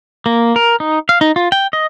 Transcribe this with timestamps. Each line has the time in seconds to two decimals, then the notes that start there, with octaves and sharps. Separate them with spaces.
0.26 A#3
0.56 A#4
0.80 D#4
1.09 F5
1.21 D#4
1.36 F4
1.52 G5
1.73 D#5